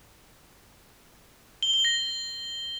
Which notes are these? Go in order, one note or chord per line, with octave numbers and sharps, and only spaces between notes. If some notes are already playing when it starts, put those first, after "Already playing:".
G7
G7
A#6